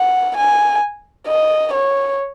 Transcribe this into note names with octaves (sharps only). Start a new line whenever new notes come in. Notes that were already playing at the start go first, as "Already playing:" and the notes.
Already playing: F#5
G#5
D#5
C#5